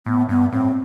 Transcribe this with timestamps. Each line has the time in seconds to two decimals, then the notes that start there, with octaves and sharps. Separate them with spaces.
0.06 A2 B3
0.29 G2 B3
0.52 A2 C4